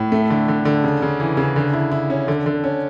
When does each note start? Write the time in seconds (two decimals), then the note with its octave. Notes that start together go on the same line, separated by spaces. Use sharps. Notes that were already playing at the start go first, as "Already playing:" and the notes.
Already playing: A2
0.12 A3
0.30 D3
0.48 D3
0.65 D3
0.84 C#3
1.02 C#3
1.20 E3
1.37 C#3
1.56 D3
1.73 E4
1.91 E4
2.10 C#4
2.28 D3
2.46 D3
2.64 C#4